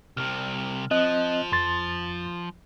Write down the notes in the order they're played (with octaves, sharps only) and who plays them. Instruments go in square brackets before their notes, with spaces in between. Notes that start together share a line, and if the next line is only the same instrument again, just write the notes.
[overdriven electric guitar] C2 C3 [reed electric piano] F6
[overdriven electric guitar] F3 [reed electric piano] C4 D#5 F#6
[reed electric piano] F2 C6 A6